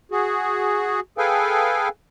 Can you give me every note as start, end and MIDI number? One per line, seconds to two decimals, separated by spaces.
0.12 1.00 66
0.12 1.00 68
1.18 1.89 68
1.18 1.89 69
1.18 1.89 71
1.18 1.89 77
1.18 1.89 79
1.18 1.89 80